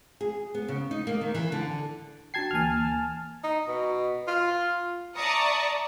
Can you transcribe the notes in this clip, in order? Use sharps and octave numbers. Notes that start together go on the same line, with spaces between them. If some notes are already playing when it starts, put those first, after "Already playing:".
G#4
B3
C#3
D#4
A#3
D#3
E3
D3
D4 F#4 G5 A5 G#6 C7
D2 E3 A#3 G#5 A5 F6
D#4
B2
F4
D5 E5 A5 A#5 C#6 D#6